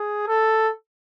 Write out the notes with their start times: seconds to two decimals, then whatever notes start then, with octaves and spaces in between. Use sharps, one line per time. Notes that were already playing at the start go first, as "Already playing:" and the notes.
Already playing: G#4
0.27 A4